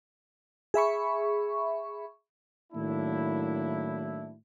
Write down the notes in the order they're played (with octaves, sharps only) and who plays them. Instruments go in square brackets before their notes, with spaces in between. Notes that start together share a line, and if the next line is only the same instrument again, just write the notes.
[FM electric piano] G#4 E5 B5 C#6
[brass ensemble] A2 D#3 F#3 A#3 D4 E4